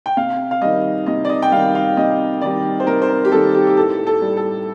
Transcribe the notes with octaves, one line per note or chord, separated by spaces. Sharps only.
G5
C3 F5
F5
D#3 G3 D#5
C3 D#5
D5
D#5
G5
D#3 G3 F5
F5
C3 D#5
D#3 G3 D5
C5
C3 A#4
C5
A#4
G4
D#3 G3 A4
G4
G4
A2 A4
A4
G3
A4